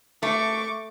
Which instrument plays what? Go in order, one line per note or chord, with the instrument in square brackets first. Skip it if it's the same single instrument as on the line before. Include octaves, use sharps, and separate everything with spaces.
[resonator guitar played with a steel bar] A3 [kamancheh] C#6 D6